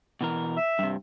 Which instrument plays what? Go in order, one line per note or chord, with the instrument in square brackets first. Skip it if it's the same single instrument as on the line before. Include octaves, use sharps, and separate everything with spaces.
[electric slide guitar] B2 E3 A#4
[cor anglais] E5
[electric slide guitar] G2 C3